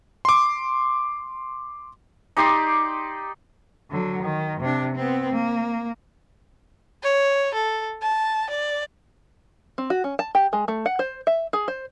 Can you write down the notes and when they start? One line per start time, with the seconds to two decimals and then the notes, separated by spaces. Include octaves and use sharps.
0.25 C6 D6
2.37 D#4 G4 D5 C6
3.91 D3 F#3
4.22 D#3
4.60 C3 D4
4.95 B3 C4
5.32 A#3
7.03 C#5
7.54 A4
8.02 A5
8.50 D5
9.78 C4
9.90 F#4
10.04 C#4
10.19 A5
10.35 G4
10.53 G#3
10.68 A3
10.86 F#5
10.99 C5
11.27 E5
11.53 G#4
11.68 C5